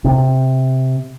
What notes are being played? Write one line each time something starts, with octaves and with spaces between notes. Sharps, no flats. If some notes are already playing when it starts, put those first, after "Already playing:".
C3